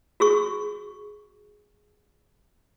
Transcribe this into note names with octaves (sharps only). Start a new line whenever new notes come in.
F#4 G#4 C#6